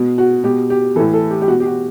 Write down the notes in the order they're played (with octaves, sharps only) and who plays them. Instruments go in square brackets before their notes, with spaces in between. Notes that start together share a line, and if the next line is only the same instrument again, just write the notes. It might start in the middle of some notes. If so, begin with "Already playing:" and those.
Already playing: [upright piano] B2
F#4
B2 G4
G4
E3 A4
A2
A4
G4
G4
B2 F#4
G4
F#4